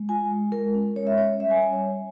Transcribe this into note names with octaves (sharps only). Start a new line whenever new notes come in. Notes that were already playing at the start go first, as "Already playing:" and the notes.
Already playing: G#3
F4 G#5
G#3
G#3 A#4
C#4
G#3 C#5
E5
C#4 C#5
G3 E5
G#5
G3 G#5
C#5
G3